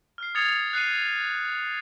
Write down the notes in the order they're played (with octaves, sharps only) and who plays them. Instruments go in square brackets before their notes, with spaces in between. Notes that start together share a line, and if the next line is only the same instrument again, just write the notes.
[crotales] F6 C7
D#6 G#6 A6 C7 C#7 F7
F#6 C7 C#7 D#7